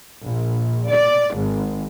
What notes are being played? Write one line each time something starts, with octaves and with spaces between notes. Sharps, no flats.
A#1
D5
G#1